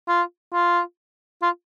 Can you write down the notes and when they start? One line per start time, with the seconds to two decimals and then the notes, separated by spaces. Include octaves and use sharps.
0.08 F4
0.54 F4
1.42 F4